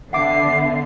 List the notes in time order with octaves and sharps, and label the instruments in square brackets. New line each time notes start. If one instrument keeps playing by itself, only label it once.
[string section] D3 B3 [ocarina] E5 [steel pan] F#5 D6 [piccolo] C7